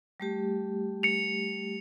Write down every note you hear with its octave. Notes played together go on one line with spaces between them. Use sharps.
G3 A3 G4
C#7 F7